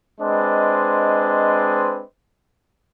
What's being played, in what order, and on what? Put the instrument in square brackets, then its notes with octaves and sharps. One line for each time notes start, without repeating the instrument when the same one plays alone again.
[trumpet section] G#3 C4 D4 B4 C5 D#5